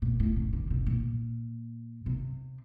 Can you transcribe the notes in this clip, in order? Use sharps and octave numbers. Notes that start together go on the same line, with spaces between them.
A#2
A2
C#3
C3
C3
A#2
C3